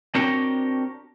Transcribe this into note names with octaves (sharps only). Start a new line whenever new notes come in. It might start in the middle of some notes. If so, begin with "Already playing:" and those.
C4 D4 F#4 G4 A#4 C#5